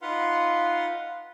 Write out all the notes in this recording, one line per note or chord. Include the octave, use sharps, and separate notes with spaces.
D#4 F4 B4 F5 F#5 C6